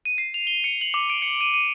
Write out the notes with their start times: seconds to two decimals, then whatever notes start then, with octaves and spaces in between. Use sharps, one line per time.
0.05 D#7
0.18 C7
0.34 F7
0.47 G7
0.64 C#7
0.81 F#7
0.94 D6
1.10 D7
1.22 C#7
1.41 D#7
1.54 D#7